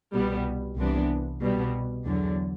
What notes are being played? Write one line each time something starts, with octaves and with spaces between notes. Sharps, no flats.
C2 B2 G3 B3
C2 C3 E3 B3 D4
C2 B2 G3 B3
E2 D3 F#3